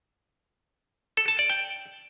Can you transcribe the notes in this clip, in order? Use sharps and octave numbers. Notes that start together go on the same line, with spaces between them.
A4
A5
D5
G5